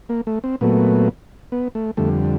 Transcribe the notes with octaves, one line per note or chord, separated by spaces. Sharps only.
A#3
A3
C4
A#2 F#3 A3 B3
B3
A3
F2 D3 G3 A3